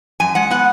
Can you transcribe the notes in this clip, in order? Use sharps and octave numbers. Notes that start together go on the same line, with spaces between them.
F#2 G#5
G#3 F#5
B3 F#5